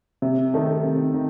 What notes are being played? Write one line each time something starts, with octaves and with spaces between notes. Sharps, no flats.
C3
D#3 A3 D#4 A4
C3
D#3